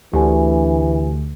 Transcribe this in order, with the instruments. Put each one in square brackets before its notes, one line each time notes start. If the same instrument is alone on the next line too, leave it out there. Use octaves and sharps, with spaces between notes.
[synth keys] D2 [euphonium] E3 [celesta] G4 G#5